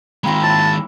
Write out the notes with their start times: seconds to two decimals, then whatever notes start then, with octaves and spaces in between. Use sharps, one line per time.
0.24 D#3 G#3 A#3 C4 F4 B5 E6 A#6
0.43 E4 C#5 A5